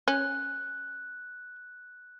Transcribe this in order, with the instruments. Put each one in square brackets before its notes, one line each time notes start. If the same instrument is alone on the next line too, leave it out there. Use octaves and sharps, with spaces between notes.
[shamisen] C#4 [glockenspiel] F#6